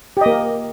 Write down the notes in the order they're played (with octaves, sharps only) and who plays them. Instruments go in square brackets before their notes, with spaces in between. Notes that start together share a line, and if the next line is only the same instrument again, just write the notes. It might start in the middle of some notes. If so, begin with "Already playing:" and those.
[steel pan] G4
D#5
A#3